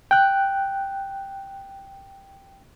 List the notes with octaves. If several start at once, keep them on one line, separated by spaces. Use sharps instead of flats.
G5 F#6